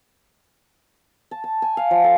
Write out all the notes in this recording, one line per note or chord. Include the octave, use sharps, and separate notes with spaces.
A5
A5
G#5
F5
F3
A4